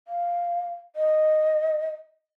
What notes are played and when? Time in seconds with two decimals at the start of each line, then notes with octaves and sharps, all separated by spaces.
0.08 F5
0.96 D#5